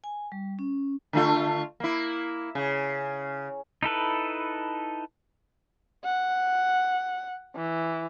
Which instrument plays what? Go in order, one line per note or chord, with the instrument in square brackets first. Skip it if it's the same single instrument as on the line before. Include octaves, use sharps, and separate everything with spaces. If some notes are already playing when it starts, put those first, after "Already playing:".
[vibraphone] G#5
G3
C#4
[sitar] D3 A3 F4
A#3 E4
C#3
[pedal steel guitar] D#4 E4 A4 B4
[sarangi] F#5
E3